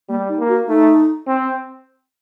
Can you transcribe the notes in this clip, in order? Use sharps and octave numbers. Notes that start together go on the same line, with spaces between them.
G3 A#3
D#4
A#3
F#4
A3 D#4
C4